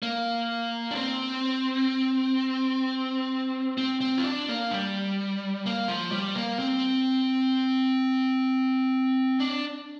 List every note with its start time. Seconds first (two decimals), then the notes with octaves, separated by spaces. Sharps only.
0.03 A#3
0.91 D4
0.95 C4
3.78 C4
4.01 C4
4.18 F4
4.24 D4
4.48 A#3
4.71 G3
5.66 A#3
5.88 F3
6.12 G3
6.35 A#3
6.59 C4
9.40 D4